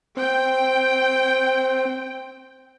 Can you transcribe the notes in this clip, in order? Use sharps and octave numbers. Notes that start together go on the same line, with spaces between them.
C4 G5